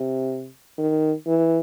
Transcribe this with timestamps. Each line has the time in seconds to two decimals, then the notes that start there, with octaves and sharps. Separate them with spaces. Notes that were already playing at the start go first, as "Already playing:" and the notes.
Already playing: C3
0.78 D#3
1.27 E3